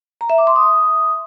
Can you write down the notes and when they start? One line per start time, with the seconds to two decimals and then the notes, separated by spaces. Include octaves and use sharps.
0.21 A#5
0.30 E5
0.38 D6
0.47 C6
0.56 D#6